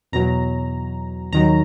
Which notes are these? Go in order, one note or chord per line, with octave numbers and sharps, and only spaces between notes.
E2 B2 F#3 A#5
D#2 D#3 F#3 A#5